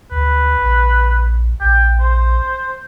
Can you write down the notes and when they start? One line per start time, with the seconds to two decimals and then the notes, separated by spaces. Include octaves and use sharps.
0.12 D2 B4
0.61 A#1
1.61 A#1 G5
2.00 C5